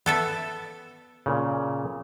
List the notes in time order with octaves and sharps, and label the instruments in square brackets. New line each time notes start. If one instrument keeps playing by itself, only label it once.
[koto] B3 A4 E5
[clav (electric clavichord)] A#2 C#3